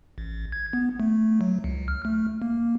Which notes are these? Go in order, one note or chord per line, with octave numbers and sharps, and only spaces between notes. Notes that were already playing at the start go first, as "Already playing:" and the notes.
A1
G#6
B3
A3
F#3
C#2
F6
A3
A#3